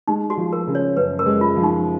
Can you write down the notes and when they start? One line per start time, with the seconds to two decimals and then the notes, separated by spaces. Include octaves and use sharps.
0.08 G#3 D#4
0.30 F#4
0.37 F3
0.53 A#4
0.67 C#3
0.75 C#5
0.97 F#2 B4
1.19 A#4
1.26 G#3
1.41 F4
1.56 F3
1.63 D#4